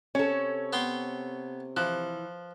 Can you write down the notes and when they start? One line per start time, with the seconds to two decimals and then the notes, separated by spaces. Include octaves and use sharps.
0.15 C3 C#4 A4 C#5
0.73 B3 G5 C6
1.77 E3 F3 F#6